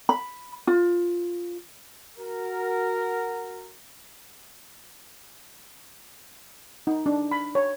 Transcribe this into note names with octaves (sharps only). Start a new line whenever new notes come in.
B5
F4
F#4 A#4
D#4
D4
B5
C#5